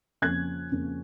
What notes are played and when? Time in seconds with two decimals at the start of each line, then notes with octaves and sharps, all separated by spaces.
0.22 F2 C#3 F3 A#3 C#4 F#6 G#6
0.71 F2 C#3 F3 A#3 C#4